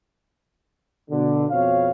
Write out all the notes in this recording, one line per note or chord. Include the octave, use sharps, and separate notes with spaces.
B2 D3
F2 B2 C4 C#5 F5